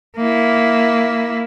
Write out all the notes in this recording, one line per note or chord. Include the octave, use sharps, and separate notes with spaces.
A#3 E4